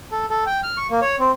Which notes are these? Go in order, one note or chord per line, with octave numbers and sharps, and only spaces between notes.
A4
A4
G5
F6
C#6
A#3
C#5
C4